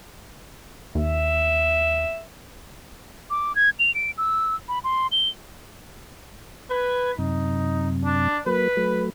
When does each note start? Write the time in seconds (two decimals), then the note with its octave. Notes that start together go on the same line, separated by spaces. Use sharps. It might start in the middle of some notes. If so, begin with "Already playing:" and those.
0.95 D#2 E5
3.30 D6
3.55 G#6
3.79 F7
3.95 D7
4.18 E6
4.69 B5
4.84 C6
5.12 G7
6.70 B4 G#6
7.18 F#2 C3 D#4
8.04 D4
8.46 F#3 A#3 B4
8.77 F#3 A3